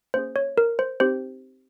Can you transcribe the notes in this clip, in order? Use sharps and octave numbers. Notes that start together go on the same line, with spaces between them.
A#3 C#4 G#4 C5
C#5
A#4
C5
C4 D#4 G4 C5